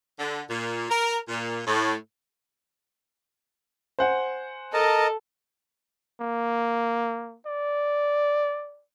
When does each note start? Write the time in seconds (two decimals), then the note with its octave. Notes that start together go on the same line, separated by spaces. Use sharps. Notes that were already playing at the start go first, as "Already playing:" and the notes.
0.19 D3
0.49 A#2
0.90 A#4
1.28 A#2
1.66 A2
3.99 C5 F#5 G#5
4.73 A4 A#4 D#5 A5
6.21 A#3
7.46 D5